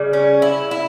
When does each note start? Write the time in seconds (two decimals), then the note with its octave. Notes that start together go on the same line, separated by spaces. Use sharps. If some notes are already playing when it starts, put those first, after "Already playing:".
Already playing: C#3 G3
0.13 C#4
0.42 E4
0.71 E4